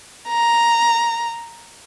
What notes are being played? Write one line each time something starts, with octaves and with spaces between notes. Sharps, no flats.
A#5